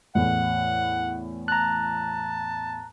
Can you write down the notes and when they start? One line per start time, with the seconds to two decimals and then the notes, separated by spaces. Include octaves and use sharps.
0.15 E2 A2 F#5
1.48 A5 A#5 F#6